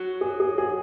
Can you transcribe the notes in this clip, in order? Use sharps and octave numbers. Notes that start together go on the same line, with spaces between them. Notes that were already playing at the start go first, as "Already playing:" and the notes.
Already playing: F#3 F#4
G#4
G#4
G#4